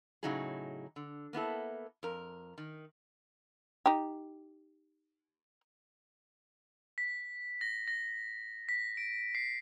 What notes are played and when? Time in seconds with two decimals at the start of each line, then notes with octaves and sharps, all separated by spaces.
0.23 A2 C#3 F#3 D#4 E4 G#4
0.96 D3
1.33 A#3 B3 E4 A4
2.03 F2 A#4
2.58 D#3
3.86 D#4 G4
6.98 B6
7.61 A#6
7.88 A#6
8.69 B6
8.97 D7
9.35 C7